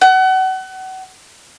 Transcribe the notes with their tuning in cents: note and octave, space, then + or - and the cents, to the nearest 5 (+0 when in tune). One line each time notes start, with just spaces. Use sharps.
F#5 +30